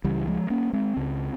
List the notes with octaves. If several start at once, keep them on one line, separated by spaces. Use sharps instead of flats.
C#2 C#3 E3 G3
F3 G#3
A#3 C#4
G#3 C4
C#2 C#3